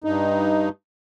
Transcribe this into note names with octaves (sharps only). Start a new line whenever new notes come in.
G2 D#4